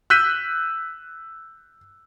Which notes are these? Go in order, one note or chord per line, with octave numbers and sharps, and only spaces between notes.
E6 F#6 G6 B6 D#7